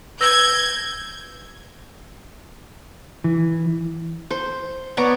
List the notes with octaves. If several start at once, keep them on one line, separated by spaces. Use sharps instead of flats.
B4 E6 G6 G#6 A#6
E3
C5
B3 C#5 D5 A#5